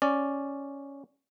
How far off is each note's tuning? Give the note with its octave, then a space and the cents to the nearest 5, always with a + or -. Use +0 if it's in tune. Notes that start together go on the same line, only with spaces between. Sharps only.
C#4 +0 D5 +0